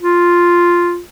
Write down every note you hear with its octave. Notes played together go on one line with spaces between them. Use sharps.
F4